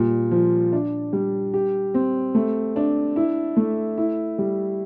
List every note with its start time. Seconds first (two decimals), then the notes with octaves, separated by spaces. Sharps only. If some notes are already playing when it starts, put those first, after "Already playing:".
Already playing: A#2 G3
0.31 F3
0.73 D4
1.13 G3
1.54 G4
1.94 C4
2.35 A3
2.76 D4
3.16 E4
3.57 A3
3.98 E4
4.38 G3